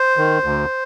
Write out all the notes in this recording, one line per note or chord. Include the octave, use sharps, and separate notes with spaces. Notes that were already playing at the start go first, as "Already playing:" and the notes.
Already playing: C5
D#3
D2